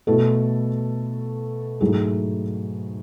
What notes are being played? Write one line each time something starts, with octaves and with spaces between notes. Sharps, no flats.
B2 A3 E4 A4
G#2 F#3 A3 E4 G#4